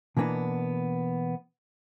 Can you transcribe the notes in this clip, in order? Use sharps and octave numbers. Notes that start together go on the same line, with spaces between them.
B2 E3 A#3 B3 D4